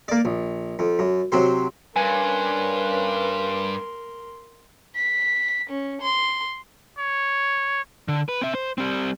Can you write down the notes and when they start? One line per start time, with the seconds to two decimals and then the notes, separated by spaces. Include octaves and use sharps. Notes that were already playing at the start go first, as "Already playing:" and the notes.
0.08 A#3 D5
0.25 A#1
0.79 F2
0.99 F#2
1.32 C3 F#3 C5
1.96 G2 C#4 A#4 B4 G#5 C6
4.96 B6
5.69 C#4
6.01 C6
6.98 C#5
8.08 D3
8.29 B4
8.41 C4 E5
8.55 C5
8.78 G3 C4